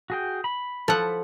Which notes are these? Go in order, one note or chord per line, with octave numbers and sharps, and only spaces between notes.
F#4 G#4 G5
B5
F3 A4 F#5